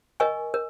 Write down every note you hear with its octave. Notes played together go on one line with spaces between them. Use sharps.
A#4 D#5 G#5 C#6
A#4